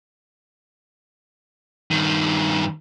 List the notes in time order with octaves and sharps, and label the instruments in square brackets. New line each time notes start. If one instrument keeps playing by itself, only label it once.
[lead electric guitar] G2 D#3